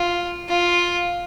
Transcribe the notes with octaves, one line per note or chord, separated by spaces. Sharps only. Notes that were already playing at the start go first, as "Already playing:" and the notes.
Already playing: F4
F4